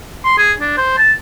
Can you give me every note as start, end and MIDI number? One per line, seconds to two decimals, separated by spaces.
0.24 0.37 84
0.38 0.52 68
0.61 0.73 62
0.77 0.96 72
0.97 1.12 81